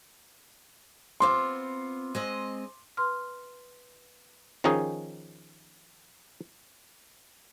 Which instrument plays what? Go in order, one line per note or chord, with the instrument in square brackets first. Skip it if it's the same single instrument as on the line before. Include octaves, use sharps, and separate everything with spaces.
[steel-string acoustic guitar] B3 C4 F4 [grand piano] C6 D6
[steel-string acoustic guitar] G#3 C4 D#5
[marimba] B4 C6 F6
[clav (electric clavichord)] D#3 F3 C#4 D#4 G#4